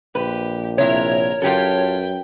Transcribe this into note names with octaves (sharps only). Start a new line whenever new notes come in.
A#1 G4 B4
C3 E4 A#4 C#5
F#2 F4 G4 A4 B4 G5